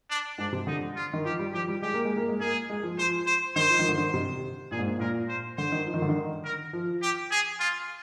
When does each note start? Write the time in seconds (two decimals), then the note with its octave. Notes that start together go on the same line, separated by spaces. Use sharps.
0.10 D4
0.38 G#2 D4
0.52 C3
0.67 D3 D#4
0.96 F4
1.13 D#3
1.25 F3 G4
1.39 G3
1.54 F3 G4
1.68 G3
1.82 G#3 G4
1.94 A#3
2.05 G#3
2.17 A#3
2.28 G#3
2.40 A#3 G#4
2.70 G#3
2.83 F3
2.98 F3 C5
3.27 C5
3.56 D#3 C5
3.70 F3
3.79 D#3
3.89 D3
3.98 D#3
4.14 C3
4.71 A#2 G#4
4.79 G#2
4.86 A#2
5.00 A#2 A#4
5.29 C5
5.57 D3 C5
5.72 D#3
5.87 F3
5.94 D#3
6.02 D3
6.09 D#3
6.44 A#4
6.73 F3
7.02 G4
7.31 G#4
7.60 F4